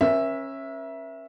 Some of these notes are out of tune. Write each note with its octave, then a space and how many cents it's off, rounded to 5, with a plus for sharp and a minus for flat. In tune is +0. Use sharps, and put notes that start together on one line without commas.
C#4 -25 A#4 +45 E5 +0